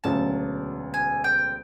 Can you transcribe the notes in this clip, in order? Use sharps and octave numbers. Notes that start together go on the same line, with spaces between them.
E1 D2 C#3 F#3 A5
G#5
G5